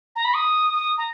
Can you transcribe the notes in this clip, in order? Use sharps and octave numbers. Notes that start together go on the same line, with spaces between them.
A#5
B5
D#6
D#6
A#5